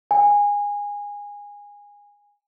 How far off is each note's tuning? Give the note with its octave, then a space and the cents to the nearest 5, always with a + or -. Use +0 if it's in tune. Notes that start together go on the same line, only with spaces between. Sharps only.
G#5 -20